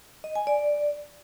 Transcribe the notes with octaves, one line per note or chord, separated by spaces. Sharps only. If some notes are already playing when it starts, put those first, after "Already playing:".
D#5
G#5
D5